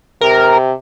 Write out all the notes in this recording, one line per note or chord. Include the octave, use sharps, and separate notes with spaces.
C3 A#4